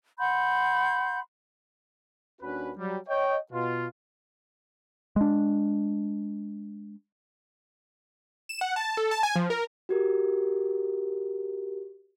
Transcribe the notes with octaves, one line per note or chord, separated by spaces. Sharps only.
F#5 B5 C6 G6
D#2 C#4 D4 F#4 B4
F#3 G3
C#5 D#5 G5
B2 F4
G#3 D4
E7
F#5
A5
A4
A5
G#5
F3
A#4
F#4 G4 A#4